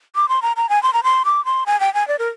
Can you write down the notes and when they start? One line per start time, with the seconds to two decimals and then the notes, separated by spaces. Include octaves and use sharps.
0.16 D6
0.29 C6
0.42 A#5
0.56 A#5
0.69 G#5
0.83 C6
0.93 A#5
1.03 C6
1.25 D6
1.45 C6
1.66 G#5
1.80 G5
1.94 G#5
2.08 D5
2.19 A#4